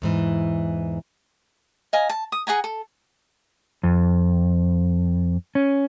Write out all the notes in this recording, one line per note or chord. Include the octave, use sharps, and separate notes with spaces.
E2 G#2 E3
D#5 F5 G#5 A#5
A5
D#6
G#4 F#5 G#5 A#5
A4
F2
C#4